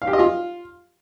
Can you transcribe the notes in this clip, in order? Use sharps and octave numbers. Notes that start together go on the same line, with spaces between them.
F5
G4
D#5
F4